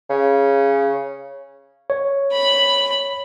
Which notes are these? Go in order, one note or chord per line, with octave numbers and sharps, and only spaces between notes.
C#3
C#5
B5